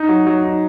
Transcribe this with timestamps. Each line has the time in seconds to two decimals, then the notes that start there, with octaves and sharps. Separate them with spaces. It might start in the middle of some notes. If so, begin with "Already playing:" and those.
Already playing: D#4
0.09 F#3
0.26 F#3
0.44 D#4